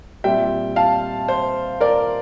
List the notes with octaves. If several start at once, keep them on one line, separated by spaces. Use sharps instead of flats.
A#2 G3 C4 E5 G5
F5 A5
C5
A#4 D5